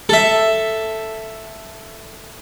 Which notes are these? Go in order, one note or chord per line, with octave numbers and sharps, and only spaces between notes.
A4 E5